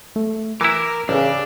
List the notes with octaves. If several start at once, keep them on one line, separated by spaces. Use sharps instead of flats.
A3
E3 E4 A#4 D6 E6
A1 C#3 D4